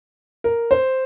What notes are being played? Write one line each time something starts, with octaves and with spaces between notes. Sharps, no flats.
A#4
C5